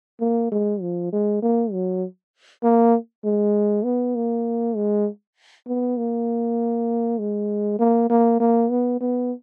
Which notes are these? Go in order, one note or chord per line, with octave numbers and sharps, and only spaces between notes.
A#3
G#3
F3
G#3
A#3
F#3
A#3
G#3
B3
A#3
G#3
B3
A#3
G#3
A#3
A#3
A#3
B3
B3